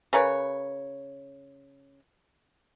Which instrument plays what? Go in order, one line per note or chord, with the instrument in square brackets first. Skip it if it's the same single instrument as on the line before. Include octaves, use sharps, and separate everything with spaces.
[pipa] C#3 A#4 B4 C#5